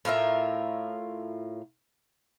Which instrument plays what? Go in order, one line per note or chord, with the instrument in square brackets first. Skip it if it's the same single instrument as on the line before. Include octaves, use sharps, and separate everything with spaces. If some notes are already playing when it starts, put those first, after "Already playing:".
[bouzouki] A2 F4 A#4 E5